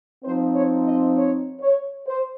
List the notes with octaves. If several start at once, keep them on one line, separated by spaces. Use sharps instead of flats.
F3 C4 D#4 C5
C#5
D#5
C#5
C#5
C5